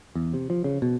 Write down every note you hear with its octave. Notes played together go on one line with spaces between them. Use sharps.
E2
C3
F3
C#3
B2